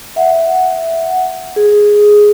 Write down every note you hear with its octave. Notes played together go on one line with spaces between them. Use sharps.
E5 F#5
G#4